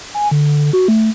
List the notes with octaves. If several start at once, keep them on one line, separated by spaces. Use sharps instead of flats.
G#5
D3
F#4
A3